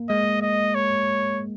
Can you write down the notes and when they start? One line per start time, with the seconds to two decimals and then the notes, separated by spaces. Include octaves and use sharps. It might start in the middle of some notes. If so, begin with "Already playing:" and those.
Already playing: A#3
0.09 G#3 D#5
0.42 D#5
0.75 C#5